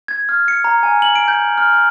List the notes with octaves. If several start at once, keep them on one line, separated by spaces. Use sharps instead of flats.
G#6
F6
C#7
A#5
G#5
F#7
D7
G6
F6
F6
F6